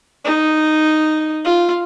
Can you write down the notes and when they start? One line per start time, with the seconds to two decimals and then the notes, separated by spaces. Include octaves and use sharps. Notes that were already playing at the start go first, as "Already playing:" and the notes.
0.25 D#4
1.45 F4